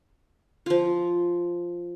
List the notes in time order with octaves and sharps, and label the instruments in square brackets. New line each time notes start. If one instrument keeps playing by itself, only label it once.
[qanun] F3 F4